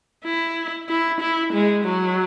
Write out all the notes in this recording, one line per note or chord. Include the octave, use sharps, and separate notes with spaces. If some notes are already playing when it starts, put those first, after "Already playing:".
E4
E4
E4
G#3
F#3